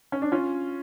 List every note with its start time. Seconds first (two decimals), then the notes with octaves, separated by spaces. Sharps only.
0.12 C#4
0.22 D4
0.32 C#4 F4